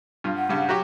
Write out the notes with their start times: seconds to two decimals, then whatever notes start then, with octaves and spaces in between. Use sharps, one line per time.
0.24 G2 F4
0.37 F#5
0.49 G2 C#3 G3
0.69 F#3 F#4 G4